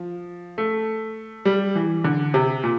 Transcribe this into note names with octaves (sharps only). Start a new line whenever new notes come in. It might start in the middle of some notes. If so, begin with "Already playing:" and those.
Already playing: F3
A3
G3
E3
D3
C3
A#2